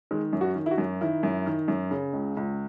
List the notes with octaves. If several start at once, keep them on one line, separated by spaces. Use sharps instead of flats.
D#3 G#3
F#2
F#4
D#3
E4
F#4
F#2
D#3 E4
F#2
D#3
F#2
C#3
C#2
C#2